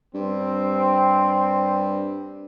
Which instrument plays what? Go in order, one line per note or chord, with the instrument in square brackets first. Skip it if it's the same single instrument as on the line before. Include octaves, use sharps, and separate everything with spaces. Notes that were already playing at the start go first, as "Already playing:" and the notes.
[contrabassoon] G2 [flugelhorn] C4